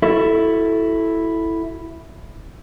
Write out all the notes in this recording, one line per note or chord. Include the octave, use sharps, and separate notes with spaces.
E4 F#4 A4